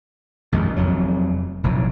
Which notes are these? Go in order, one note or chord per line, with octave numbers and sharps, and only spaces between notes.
A#1 F2 D#3 G#3
F1 F2 F#3
F1 B1 A2 F3